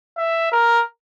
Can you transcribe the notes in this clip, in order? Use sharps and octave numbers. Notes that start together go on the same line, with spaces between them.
E5
A#4